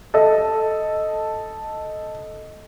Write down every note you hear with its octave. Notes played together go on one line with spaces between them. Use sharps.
A4 D#5